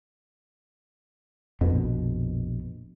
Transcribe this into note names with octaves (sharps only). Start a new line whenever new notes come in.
A#1 F2 B2